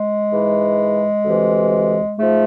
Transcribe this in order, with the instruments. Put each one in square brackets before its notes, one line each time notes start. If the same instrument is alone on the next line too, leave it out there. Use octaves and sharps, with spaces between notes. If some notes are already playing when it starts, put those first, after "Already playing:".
Already playing: [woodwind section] G#3
G#2 E3
D2 C3 E3
G#2 F3 A3